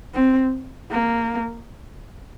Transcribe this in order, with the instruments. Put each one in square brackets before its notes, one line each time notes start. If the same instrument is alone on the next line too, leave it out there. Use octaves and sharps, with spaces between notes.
[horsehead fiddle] C4
A#3